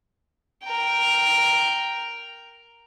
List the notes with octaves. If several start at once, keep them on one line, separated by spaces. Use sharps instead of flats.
A#4 G5